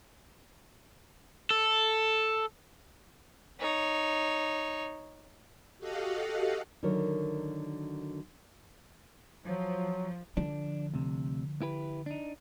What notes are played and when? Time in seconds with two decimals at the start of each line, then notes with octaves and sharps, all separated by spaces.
1.50 A4
3.59 D#4 C#5
5.79 F#4 G4 A4 D#5 F5 F#5
6.83 D3 D#3 F#3 F#4 A#4 C#5
9.44 F3 F#3
10.37 D3 F3 D4
10.94 D2 C3
11.62 E4 G4 B4
12.06 D4 D#4